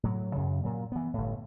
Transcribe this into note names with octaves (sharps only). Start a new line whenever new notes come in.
A2 F#3
F#2 C#3
A#2 F#3
E3 B3
G1 A2